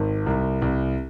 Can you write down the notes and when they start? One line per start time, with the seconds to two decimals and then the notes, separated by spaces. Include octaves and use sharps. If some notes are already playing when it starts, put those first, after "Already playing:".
Already playing: G#1
0.26 C2
0.62 C2